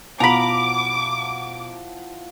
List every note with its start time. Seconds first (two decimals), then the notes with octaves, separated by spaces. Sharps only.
0.20 B2 F3 E4 F#5 A#5 B5 D6